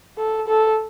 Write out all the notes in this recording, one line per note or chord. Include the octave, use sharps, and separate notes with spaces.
A4
A4